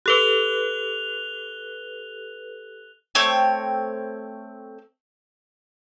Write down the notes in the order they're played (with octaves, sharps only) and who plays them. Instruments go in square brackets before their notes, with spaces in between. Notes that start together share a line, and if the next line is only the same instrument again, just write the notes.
[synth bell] G4 A4 B4 [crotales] F#6 F7 G7
[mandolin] A3 C4 C#5 G5